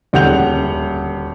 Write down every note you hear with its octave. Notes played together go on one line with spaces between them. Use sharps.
D#1 D2 F#5 G6 F7